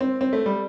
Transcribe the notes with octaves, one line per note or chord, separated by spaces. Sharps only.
C4
C4
A3
G3